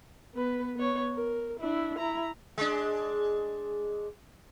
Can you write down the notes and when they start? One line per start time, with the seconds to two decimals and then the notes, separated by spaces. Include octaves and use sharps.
0.34 B3 B4
0.76 B3 C#5
1.14 A#4
1.60 D4 E4
1.99 E4 A#5
2.58 G#3 D4